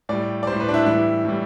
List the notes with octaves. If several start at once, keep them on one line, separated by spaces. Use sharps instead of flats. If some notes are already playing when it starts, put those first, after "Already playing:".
A2 G3 D5
D5
G3 C5
A2
B4
D4
E4
A2 E3 G3 E4
A2 E3 G3